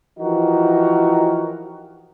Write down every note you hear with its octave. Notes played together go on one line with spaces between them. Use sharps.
E3 F3 D#4 F#4 G4 A#4